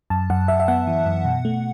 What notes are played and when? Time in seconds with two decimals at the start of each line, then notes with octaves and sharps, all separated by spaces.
0.10 F#2 A5
0.30 F#2 F#5
0.48 F#2 E5
0.60 E5
0.68 B3 F#5
0.87 E3
1.06 F#2
1.25 B2
1.45 A3